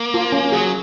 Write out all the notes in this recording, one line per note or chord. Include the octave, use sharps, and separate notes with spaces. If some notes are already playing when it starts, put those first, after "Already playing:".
Already playing: A#3
F4
C#4
F#3 G#4